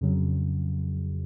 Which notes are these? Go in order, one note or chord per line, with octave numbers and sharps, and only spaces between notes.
F2 C#3 F#3